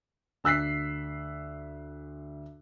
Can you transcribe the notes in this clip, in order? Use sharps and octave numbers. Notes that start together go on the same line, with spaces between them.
D2 E6 F#6 B6 C7